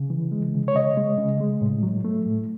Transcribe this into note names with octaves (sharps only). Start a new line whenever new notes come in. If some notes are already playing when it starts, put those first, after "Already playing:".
Already playing: C#3
E3
G#3
C#3
C#5
C#3 D#5
G#3
C#3
G#3
A2
F#3
A3
A2